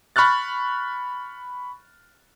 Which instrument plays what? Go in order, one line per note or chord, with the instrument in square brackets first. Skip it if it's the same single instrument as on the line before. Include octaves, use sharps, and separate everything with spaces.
[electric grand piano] B5 C#6 F6 F#6 A6